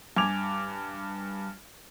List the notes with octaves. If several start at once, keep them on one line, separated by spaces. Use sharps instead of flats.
G2 G#5 D6 G#6 F7